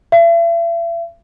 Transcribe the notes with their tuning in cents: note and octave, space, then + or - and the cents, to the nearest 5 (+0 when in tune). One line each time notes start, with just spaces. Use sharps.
E5 +40